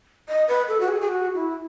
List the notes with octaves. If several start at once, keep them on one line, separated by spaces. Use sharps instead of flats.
D#5
B4
A4
F#4
G#4
G#4
F#4
E4